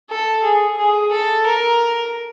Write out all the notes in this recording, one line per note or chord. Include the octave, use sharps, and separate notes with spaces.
A4
G#4
G#4
A4
A#4